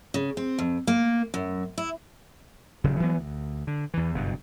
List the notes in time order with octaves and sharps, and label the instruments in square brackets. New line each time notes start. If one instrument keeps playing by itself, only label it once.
[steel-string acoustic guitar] C#3
C4
F2
A#3
F#2
E4
[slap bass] D#1 C#3 F#3
E3 F#3 B3
D2
D3
E2 E3
F#1 G2 B2